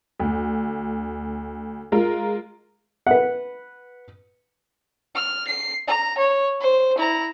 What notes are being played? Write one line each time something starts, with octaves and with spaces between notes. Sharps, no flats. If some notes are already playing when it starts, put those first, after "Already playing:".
D2
G#3 F4 A#4
B4 F#5
F6
C7
A#5
C#5
C5
E4 A#5